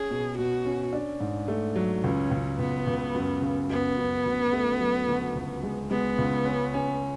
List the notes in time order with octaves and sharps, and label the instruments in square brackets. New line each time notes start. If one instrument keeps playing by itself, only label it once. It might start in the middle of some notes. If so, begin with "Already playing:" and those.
Already playing: [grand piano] C#4 [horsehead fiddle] G#4
[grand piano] B2
[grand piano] B2 [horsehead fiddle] F#4
[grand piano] C#4
D4
G#2
A3
F#3
[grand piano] C#2 [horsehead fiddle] C#4
[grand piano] C#2
[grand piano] C#2 [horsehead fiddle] B3
[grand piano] C#2
F#2
C#3
[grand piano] F#2 [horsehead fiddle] B3
[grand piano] F#2
D2
A3
F#3
D2
C#2
G#3
[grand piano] G#3 [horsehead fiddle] B3
[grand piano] C#2
C#4
C#4